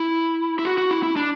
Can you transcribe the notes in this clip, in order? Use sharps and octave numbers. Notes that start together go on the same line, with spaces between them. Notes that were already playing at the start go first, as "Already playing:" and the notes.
Already playing: E4
E4
F#4
F#4
E4
E4
D4